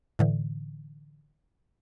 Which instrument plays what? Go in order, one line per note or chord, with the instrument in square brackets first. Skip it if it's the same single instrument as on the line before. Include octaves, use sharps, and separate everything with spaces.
[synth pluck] A2 D3 E3